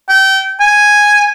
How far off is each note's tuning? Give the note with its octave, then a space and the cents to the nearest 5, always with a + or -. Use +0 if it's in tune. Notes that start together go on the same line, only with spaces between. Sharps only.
G5 -25
G#5 -5